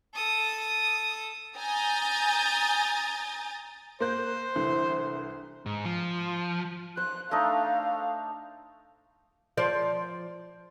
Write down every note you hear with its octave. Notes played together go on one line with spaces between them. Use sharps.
A4 D#6
G#5 A#5 D#6 G6 A6
A#3 C5 F#6 G6
C2 D3 E3
G#2
F3
C5 F#6
A3 D4 D#4 F5
F3 C5 D5